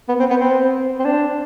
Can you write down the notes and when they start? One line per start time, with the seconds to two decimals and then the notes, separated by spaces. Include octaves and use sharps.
0.09 B3
0.19 C4
0.30 B3
0.41 C4
0.99 C4
1.05 D4